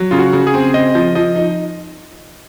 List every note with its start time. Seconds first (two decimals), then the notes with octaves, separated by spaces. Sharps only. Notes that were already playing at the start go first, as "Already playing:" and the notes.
Already playing: F#3
0.11 C#3 F4
0.19 F#4
0.33 C#3
0.47 G#4
0.54 C4
0.74 C4 D#5
0.95 F3
1.15 F3 D#5
1.36 D#4